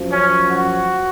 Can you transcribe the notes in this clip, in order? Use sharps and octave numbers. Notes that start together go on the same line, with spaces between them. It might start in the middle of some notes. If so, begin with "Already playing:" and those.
Already playing: F#2 F3
C#4
F#4